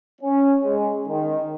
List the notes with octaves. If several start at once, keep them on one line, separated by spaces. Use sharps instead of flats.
C#4
G#3
D#3